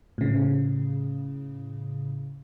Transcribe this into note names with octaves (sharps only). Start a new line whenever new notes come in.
A2 C#3